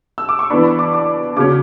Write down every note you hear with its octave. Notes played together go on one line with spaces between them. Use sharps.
E6
D6
C#6
E3 B3 D4 B5
C#6
D6
D6
C#3 F#3 C#4 D6